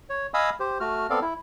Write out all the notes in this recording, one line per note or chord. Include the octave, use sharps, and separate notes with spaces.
C#5
D#5 F5 G#5 B5 D#6 E6
G4 C5
A3 F#4 F6
B3 C4 A4 D5 F5
E4